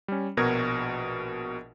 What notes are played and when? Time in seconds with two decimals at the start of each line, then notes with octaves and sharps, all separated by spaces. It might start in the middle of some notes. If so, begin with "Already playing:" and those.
0.08 G3 C#4
0.37 A#1 B2 F#4 A#4 G#6